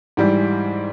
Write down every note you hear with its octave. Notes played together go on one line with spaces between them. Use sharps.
G#2 E3 G3